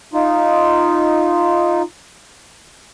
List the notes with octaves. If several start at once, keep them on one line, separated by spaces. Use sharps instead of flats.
D#4 F4